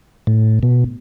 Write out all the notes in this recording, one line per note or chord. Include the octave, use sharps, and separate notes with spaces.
A2
B2